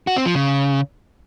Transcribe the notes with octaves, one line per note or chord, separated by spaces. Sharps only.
F#4
C4
F3
C#3